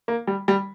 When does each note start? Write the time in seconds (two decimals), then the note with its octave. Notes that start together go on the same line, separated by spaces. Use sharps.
0.08 A#3
0.27 G3
0.48 G3